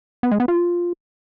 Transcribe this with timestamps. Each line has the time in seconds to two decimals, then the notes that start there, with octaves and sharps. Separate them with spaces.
0.23 B3
0.31 G#3
0.40 B3
0.48 F4